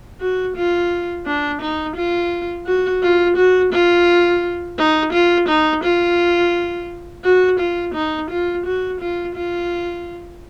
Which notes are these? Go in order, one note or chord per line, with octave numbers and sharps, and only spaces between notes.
F#4
F4
D4
D#4
F4
F#4
F4
F#4
F4
D#4
F4
D#4
F4
F#4
F4
D#4
F4
F#4
F4
F4